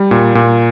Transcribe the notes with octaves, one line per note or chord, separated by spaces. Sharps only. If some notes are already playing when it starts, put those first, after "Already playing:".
Already playing: G3
A#2
A#2